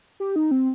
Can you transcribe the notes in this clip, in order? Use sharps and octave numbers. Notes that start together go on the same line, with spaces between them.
G4
D#4
C4